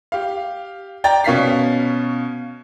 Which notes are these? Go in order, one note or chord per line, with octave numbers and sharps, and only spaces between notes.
G4 F5
D5 G5 A#5 A6
B2 C#4 F5 B6 C7